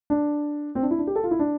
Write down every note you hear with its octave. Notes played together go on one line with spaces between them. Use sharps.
D4
C4
D4
E4
D4
G4
A4
F4
E4
D4